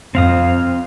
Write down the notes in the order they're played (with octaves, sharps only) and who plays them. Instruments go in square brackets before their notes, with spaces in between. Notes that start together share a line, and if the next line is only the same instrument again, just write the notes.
[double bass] F2 [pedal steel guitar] C4 F5 D#6